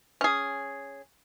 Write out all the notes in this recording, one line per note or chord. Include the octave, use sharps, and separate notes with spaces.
C#4 G#4